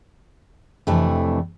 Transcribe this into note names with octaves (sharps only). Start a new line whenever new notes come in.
F2 C3 E3 A3 D4